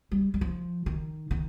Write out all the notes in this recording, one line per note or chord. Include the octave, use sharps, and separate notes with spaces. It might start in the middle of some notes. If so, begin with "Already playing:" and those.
G3
G3
F3
D#3
D#3